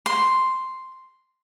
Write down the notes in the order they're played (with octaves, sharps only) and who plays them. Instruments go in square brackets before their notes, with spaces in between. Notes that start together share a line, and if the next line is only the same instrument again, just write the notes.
[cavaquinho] C6